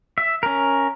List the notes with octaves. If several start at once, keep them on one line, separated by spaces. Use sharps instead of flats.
E5
C#4 A#4